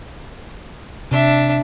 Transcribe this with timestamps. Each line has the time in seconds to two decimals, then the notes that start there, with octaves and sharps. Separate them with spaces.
1.11 C3 D4 E5